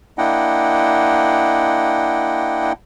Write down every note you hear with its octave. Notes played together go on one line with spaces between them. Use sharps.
A#3 D4 E4 D#5 F#5 G5